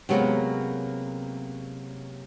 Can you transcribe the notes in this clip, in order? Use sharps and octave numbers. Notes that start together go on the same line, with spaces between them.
C3 F#3 G#3 A#3 B3 C#4